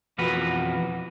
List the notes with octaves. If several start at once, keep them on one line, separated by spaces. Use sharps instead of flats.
F2 B2 E3 F4 F#4 B4